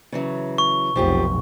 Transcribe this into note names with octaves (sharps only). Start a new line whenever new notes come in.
C#3 E3 F#3
C#6
F1 B1 F3 G4 G#4